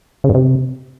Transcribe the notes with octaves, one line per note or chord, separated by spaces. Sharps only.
C#3
G2
C3